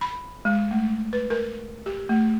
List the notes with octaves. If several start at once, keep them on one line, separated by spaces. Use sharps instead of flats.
B5
G#3
A3
B4
A#4
G4
A3